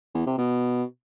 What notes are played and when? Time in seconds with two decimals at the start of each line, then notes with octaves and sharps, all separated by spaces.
0.14 E2
0.26 C3
0.38 B2